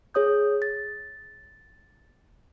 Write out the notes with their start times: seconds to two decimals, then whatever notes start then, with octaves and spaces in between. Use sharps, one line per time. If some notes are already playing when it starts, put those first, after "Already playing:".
0.14 G#4 C#5 D#6 G6
0.62 A6